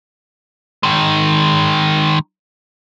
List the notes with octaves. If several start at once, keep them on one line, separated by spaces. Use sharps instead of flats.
D#3 G#3